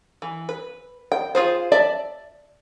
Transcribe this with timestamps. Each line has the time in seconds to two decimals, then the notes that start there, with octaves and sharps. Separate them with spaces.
0.22 E3
0.49 B4
1.12 G5
1.35 F4 G#4 C5
1.72 D5 E5 A5